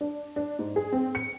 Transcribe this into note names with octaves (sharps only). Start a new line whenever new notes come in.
D4
D4
G#2
G#4
C4
C#7